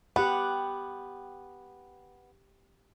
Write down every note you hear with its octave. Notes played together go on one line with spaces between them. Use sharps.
B3 G4 F#5